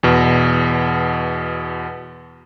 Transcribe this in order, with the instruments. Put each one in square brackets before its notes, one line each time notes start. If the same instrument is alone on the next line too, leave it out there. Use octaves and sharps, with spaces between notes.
[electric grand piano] E2 B2